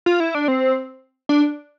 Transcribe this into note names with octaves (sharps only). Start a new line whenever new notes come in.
F4
E4
D4
C4
D4